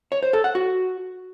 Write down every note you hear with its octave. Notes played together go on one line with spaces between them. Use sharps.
C#5
C5
A4
F#5
F#4